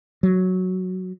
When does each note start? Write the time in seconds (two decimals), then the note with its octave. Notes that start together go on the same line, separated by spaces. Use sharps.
0.23 F#3